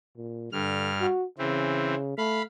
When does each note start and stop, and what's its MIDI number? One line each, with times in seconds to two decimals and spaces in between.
0.17 0.48 46
0.52 1.06 43
0.52 0.90 50
0.52 1.06 89
1.01 1.25 66
1.38 2.18 49
1.38 1.95 52
1.38 1.95 60
2.18 2.42 57
2.18 2.42 77
2.18 2.42 83